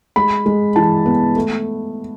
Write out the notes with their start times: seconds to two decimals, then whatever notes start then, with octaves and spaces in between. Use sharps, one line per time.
0.16 G#3 B5
0.46 G#3
0.76 E3 A5
1.06 B3
1.36 A3